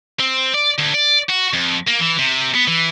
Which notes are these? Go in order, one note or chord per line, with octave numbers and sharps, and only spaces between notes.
C4
D5
D2
D5
F#4
F2
A#3
E3
C3
B3
E3